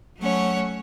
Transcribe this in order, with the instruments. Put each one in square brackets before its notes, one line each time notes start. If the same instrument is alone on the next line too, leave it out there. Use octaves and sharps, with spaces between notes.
[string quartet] F#3 A3 C#4 C#5 F#5